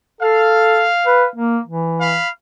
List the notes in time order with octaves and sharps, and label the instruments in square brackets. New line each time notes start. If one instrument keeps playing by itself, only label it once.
[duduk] A4 [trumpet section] F5
[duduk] B4
A#3
E3
[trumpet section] F5 B5